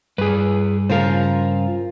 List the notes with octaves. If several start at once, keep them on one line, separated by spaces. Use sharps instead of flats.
G2 G#4 B4
C#3 F4 A#4 C5 F5